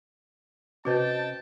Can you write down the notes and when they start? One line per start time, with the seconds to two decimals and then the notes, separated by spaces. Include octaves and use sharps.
0.85 C3 C#4 F#4 B4 C5 D#5 G5 A5